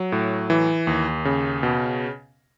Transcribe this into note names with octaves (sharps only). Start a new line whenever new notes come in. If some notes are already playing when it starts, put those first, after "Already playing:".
Already playing: F#3
A2
E3
D#2
C#3
B2